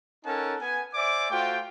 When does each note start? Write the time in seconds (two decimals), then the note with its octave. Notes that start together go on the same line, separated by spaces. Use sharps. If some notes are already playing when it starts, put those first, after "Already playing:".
0.25 C#4 D#4 A4 A#4 F#5 A5
0.61 B3 G#5
0.94 C5 D5 E5 G#5 D6
1.30 A3 F4 F#4 C5 G5